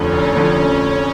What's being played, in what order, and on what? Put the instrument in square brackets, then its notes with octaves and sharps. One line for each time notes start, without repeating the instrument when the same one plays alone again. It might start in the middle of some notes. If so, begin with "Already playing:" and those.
Already playing: [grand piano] F1 F2 D3 F3 A3 [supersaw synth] C#4
[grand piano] F1
F2 D3 F3 A3